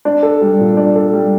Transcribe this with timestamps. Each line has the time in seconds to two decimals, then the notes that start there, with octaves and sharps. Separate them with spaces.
0.05 D4
0.23 A4
0.41 G3
0.59 A#2
0.77 D4
0.96 A4
1.13 G3